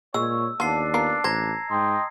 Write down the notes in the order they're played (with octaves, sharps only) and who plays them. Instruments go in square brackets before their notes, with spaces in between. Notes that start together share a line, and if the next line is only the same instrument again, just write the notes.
[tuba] A#2 [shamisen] G#3 [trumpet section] C#5 [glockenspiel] E6
[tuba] D#2 [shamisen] B3 F4 [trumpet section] D4 [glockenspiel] A5 C7
[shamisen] B3 F4 A#4 [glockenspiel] C7
[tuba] A1 [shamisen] C5 [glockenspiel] A#5 G#6 A#6
[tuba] G#2 [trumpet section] D#5 G5 C6